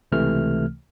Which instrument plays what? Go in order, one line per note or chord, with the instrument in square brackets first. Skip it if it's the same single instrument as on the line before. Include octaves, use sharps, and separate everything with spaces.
[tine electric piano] C#2 C3 E3 A3 F6